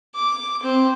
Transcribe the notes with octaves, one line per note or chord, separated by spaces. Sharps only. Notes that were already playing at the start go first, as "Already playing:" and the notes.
D6
C4